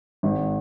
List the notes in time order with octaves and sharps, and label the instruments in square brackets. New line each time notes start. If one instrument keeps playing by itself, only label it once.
[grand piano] G#1